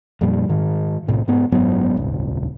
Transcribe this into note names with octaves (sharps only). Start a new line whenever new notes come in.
F2 A#2 G3
G#2 D#3
B1 A2 C3
G#2 B3
F#1 G#2 F#3 B3
D#1 G#1 C#2